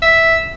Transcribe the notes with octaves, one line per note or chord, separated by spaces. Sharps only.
E5